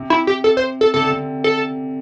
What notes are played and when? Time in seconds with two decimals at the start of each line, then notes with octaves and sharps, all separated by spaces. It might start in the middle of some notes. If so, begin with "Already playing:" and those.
Already playing: C3
0.10 E4
0.27 G4
0.44 A4
0.57 C5
0.81 A4
0.94 C3 A4
1.02 D3
1.11 C3
1.44 A4